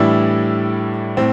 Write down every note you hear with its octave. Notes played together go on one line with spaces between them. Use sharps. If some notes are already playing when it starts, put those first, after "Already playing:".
Already playing: A2 E3 G3 D4 E4
A2 C4